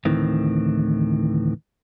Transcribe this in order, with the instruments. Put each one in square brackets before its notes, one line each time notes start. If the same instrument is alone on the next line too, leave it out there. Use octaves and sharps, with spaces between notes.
[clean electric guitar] D2 A2 D#3 E3 C4